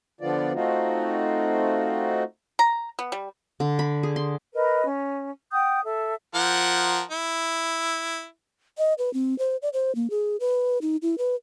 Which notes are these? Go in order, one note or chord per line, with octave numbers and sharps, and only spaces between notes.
D3 F3 B3 F4 D5
A3 C4 D#4 F4 F#4
A#5
B3
G3
D3
B5
G#4
C6
A#4 B4 D#5
C#4
F#5 G5 D#6 G6
A4 E5
F3 A#4 F#5
E4
D#5
B4
C4
C5
D5
C5
A#3
G#4
B4
D#4
E4
B4